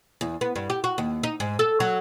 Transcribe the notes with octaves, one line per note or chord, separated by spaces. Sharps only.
E2
B3
G2
G4
F#4
D#2
D#4
G#2
A4
F#3